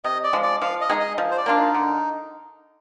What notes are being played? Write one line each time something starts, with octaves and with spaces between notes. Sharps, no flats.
C3 D#5
D5
F3 G#3
D5
F3 F5
D#5
G#3 D#4 G#4
D#5
F3
C5
D5
A#3 D4 F4
D#4
D3